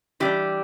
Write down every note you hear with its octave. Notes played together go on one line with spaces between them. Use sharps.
E3 G3 D4 G4